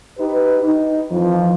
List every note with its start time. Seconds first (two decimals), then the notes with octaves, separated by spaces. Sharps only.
0.19 D#4 G4 B4
0.64 D#4
1.11 F2 E3 F3